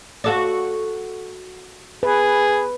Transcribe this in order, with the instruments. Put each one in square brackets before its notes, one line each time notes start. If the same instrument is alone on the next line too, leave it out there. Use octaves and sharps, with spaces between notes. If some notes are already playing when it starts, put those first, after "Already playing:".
[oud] F#4 A4 D5
[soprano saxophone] G#4 [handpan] B4